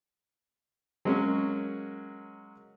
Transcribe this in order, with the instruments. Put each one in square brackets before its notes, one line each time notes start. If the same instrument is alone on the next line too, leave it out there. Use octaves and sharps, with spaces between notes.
[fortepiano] F#3 G#3 A#3 C#4